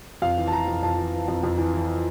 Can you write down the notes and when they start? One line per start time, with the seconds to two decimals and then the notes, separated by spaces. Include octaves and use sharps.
0.22 F2 F5
0.37 E3
0.48 A5
0.52 E3 A#5
0.68 F2
0.83 F2 A5
0.98 E3
1.13 E3
1.28 F2
1.43 F2
1.58 E3
1.74 E3